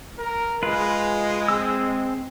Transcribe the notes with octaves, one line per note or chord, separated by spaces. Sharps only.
A#4
G#3 F4 B4
C4 E6